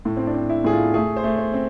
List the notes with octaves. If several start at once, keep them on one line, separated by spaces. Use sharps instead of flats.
A2
C4
D4
C4
E4
A2 G#4
F4
A3 G#4
C5
A3
C5
C4